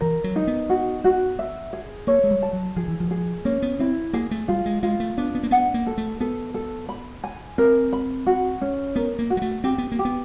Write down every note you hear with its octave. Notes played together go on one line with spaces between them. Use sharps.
E3 A#4
F#3
D#4
B3
F#4
F#4
E5
G#4
A#3 C#5
G#3
G3
A5
F#3
F3 G#4
E3
F3
G#4
A#3 C#4
B3
C4 E4
A#3 G#4
A3
G3 F4
G#3
G#3 F4
A3
B3 D4
B3
A#3
B3 F#5
A#3
A4
A3
B3 A4
A4
B5
G#5
C4 A#4
B5
F#4
C#4
B3 A#4
A#3
F#4
G#3
A3
C4 G4
B3
A#3
G4
B3